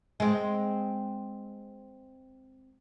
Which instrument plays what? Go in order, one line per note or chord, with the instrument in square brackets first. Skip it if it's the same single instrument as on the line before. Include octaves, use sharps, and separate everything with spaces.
[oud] G#3 C4